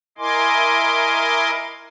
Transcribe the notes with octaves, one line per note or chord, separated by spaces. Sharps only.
E4 A#4 D#5 G#5 C6 D6